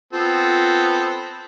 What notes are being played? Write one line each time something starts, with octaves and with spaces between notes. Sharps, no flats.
B3 C4 F4 A4